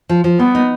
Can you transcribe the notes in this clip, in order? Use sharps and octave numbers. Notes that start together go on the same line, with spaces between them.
F3
F3
G3 B3
D#4